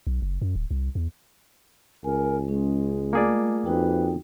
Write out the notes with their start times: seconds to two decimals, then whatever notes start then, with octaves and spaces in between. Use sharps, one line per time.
0.07 B1
0.22 F#1
0.42 F#2
0.56 D1
0.71 C2
0.95 E2
2.04 C#2 A#4 G#5
2.48 G#3 C#4
3.13 A3 A#3 F4 G#4 D5
3.65 F2 D#4 F#4 B4 G5